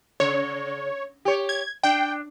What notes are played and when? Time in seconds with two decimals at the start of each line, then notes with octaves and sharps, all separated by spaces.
0.20 C#3 C#5
1.25 G4 C#5
1.49 G#6
1.83 D4 G5